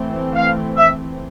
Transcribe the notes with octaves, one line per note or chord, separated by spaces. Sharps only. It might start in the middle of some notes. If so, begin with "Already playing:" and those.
Already playing: E3 A3 C4
F5
E5